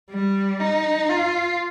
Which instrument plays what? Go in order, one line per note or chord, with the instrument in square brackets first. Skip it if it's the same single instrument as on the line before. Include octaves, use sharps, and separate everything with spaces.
[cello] G3
D#4
F4